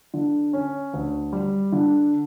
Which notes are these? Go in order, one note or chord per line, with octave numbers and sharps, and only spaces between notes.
D3
C#4
D2
G3
D3